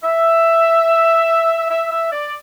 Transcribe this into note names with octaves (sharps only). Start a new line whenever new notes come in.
E5
E5
E5
D5